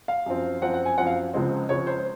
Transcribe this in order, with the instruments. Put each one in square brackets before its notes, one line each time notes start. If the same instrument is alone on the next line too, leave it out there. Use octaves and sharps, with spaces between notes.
[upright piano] F5
F#2 F3 C4
F#2 F3 C4 F#5
F#5
G#5
F#2 F3 C4 F#5
F5
C#2 C#3 F3 G#3 C4
C#2 C#3 F3 G#3 C4 C#5
C5